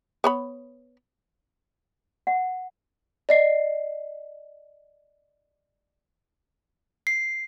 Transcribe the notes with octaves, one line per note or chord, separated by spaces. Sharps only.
B3 C#5 B5
F#5
D5 D#5 C7
C7